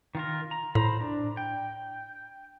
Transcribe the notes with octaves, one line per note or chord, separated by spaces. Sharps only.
D#3 F4 A#4
A#5
A2 C5 A#5 B5
D4
G5